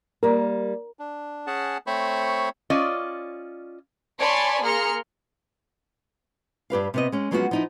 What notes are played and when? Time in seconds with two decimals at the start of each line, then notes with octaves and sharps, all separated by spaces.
0.23 G3 A#3 A#4
0.99 D4
1.47 C#4 G#4 F#5 A5
1.87 A3 C4 C5 C#5 B5 C#6
2.70 C#4 F4 D5 D#5
4.19 C#5 D5 G#5 A5 B5 C6
4.63 A#3 G#4 A#5 C6 F6 C#7
6.70 G2 G4 B4 F5
6.94 C3 B3 D#5
7.12 G#3 C#4
7.31 F3 F#3 G#3 B3 C#4 F#4
7.51 F3 D#4 E4